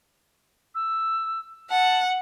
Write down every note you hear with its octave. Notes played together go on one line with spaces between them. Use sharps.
E6
F#5 A5